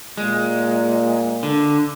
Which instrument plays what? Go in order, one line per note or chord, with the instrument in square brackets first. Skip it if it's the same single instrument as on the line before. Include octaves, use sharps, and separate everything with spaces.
[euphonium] A#2 [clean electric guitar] G#3
[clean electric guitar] D3